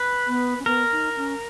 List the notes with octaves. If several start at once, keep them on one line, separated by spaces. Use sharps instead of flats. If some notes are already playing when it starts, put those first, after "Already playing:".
Already playing: B4
B3
C#4
B3 A#4
D#4
C#4